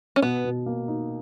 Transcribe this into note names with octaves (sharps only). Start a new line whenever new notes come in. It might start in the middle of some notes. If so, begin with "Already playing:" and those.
C#4
B2 B3
B2
A#3
D#4